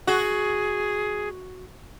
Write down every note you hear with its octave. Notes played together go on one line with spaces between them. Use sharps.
F#4 G#4